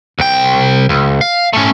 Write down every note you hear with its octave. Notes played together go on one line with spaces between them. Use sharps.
C2 G5
C#2
F5
A3 C#4